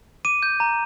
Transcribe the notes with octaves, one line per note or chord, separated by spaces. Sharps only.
D6 D#7
G6
A#5